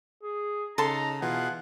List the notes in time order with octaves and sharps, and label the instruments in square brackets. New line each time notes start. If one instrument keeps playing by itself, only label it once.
[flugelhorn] G#4
[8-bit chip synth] C#3 [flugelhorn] D#4 [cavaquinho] A4 A5 C6 [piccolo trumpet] A#5
[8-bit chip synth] B2 E3 G#4 [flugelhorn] F4 [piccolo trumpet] F#5